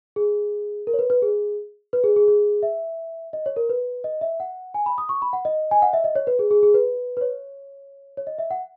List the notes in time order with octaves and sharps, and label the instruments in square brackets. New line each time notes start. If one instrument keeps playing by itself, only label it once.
[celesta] G#4
A#4
C#5
B4
B4
G#4
B4
G#4
G#4
G#4
E5
D#5
C#5
A#4
B4
D#5
E5
F#5
G#5
B5
D#6
C#6
B5
F#5
D#5
G#5
F#5
E5
D#5
C#5
B4
G#4
G#4
G#4
B4
B4
C#5
C#5
D#5
E5
F#5